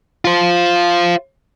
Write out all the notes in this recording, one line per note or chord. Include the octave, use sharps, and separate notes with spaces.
F4 C5